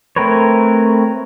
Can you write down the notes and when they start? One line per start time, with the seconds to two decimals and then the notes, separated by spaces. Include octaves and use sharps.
0.16 A3 C4 A#4 B4 C#5